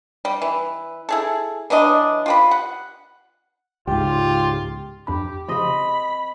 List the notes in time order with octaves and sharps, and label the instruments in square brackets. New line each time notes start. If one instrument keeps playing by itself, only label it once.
[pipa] G3
E3
E4 G#4 A4
E3 F#3 D4 D#5
F4 G4 B5
F#5
[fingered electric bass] C#2 G#2 [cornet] F4 [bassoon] G4
[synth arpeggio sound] F2 D4 B5 [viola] G4
[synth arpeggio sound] C#3 F3 [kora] C4 D#5 [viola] B5